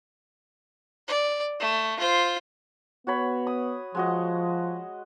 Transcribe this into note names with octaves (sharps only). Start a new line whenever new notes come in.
D5
A3
F4 C5
B3 F#4 C#5 B5
D#6
F3 G#3 F#4 D#5